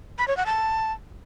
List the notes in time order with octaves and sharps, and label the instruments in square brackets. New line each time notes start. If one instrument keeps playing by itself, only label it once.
[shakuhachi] B5
C#5
F#5
A5